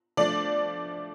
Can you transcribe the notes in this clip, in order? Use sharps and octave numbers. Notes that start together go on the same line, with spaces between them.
F3 A3 D4 D5